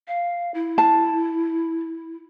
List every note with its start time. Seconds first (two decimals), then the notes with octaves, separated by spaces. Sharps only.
0.08 F5
0.54 E4
0.78 A5